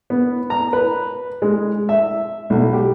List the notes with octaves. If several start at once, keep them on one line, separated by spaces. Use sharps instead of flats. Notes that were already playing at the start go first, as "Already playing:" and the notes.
B3
A#5
B4
G#3
E5
B1
G4